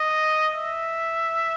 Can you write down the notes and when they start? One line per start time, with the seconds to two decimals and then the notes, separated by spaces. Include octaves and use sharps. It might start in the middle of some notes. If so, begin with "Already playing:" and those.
Already playing: D#5
0.54 E5